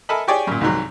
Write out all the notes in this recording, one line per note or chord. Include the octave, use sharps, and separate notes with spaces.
A4 A#4 D#5 E5 G#5 B5
G4 G#4 C#5 D5 G5 G#5
F#2 A#2
C2 G#2 D#3 F#3